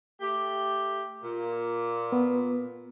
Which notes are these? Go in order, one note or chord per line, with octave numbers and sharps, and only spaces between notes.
A3 G4
A#2
B3